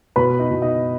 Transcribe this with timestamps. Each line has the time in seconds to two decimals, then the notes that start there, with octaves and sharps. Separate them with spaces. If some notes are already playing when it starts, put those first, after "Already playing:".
0.16 B2 B4 B5
0.39 D#4 D#5
0.51 B2
0.62 D#4 D#5